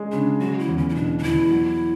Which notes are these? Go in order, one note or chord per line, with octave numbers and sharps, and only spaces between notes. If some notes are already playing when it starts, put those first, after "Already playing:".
Already playing: G#3 C#4 G#4
C#3 D4
F#3 F#4
E4
E2
C#4
E4
B2 D4
D4
E2 E4
F#3